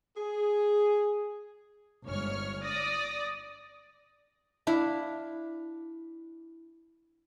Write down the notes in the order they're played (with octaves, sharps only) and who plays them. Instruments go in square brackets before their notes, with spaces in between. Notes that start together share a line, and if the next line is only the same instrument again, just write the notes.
[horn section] G#4
[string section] G1 G#2 C#5 F6
D5 D#6 A#6
[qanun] D4 E4 E5 F5